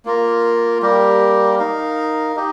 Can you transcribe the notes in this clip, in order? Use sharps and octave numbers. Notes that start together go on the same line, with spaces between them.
A#3 F4 A#4
G3 A#3 G4 A#4
D#4 A#4 F5
D#4 G4 D#5